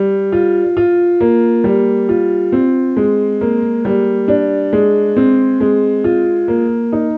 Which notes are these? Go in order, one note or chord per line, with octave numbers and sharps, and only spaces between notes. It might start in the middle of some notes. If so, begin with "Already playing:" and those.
Already playing: G3
F4
F4
A#3
G3
F4
C4
G#3
A#3
G3
D4
G#3
C4
G#3
F4
A#3
D#4